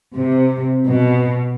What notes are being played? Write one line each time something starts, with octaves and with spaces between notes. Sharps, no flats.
C3
B2